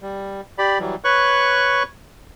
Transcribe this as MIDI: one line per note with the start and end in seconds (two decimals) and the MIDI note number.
0.02 0.41 55
0.58 0.79 67
0.58 0.79 74
0.58 0.79 83
0.79 0.96 52
0.79 0.96 54
0.79 0.96 55
1.04 1.83 71
1.04 1.83 73
1.04 1.83 85
1.04 1.83 90